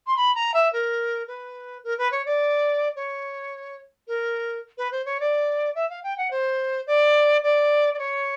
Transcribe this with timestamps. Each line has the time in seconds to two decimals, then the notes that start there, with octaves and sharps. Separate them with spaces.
0.07 C6
0.17 B5
0.35 A#5
0.54 E5
0.73 A#4
1.28 B4
1.84 A#4
1.98 B4
2.12 C#5
2.26 D5
2.96 C#5
4.08 A#4
4.78 B4
4.92 C5
5.05 C#5
5.20 D5
5.75 E5
5.90 F5
6.04 G5
6.18 F#5
6.31 C5
6.87 D5
7.43 D5
7.94 D5
7.99 C#5